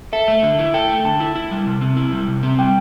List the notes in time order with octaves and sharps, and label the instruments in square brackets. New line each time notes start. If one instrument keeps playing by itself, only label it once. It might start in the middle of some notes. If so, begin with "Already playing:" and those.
[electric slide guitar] A4 [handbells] E5
[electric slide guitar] A3
D3
E4
[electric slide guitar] A4 [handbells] G5
[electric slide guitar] A3
[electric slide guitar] D3 [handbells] A5
[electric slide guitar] E4
E4
G3
C3
C4
E4
G3
C3
C4
[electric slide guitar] G3 [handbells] G5